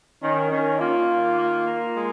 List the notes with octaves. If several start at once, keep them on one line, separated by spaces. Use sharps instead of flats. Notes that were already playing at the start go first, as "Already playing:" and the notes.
D#3 C#4
D#3 C#4
A#3 F4
D#3
A#3
A#3
G#3